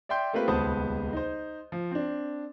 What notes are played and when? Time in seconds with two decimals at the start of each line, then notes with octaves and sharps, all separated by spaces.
0.09 D5 E5 G5 C6 G6
0.33 A3 A#3 C4 F4 G4 B4
0.48 D#1 C#2 B3 C5 A5 D#6
1.13 D#4 C5
1.72 F3
1.91 C4 D4